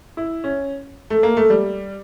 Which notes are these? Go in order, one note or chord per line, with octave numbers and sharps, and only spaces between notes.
E4
C#4
A3
A#3
A3
G3